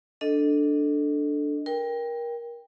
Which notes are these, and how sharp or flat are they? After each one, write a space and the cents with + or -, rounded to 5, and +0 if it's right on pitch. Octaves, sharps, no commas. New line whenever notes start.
D4 +0 A4 +0 D#5 +0
A#4 +25 G5 +15